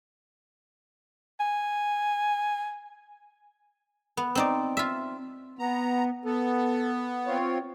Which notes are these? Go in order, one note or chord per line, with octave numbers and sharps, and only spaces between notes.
G#5
B3
C4 D#4 D5
F4 E5
B3 A#5
B3 A4
C4 F4 C#5